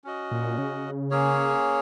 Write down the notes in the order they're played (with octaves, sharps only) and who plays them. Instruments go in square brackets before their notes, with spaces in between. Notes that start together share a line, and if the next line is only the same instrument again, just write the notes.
[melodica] C#4 F#4 D#5
[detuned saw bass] A#2
C#3
[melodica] A#3 C#4 G#4 C#5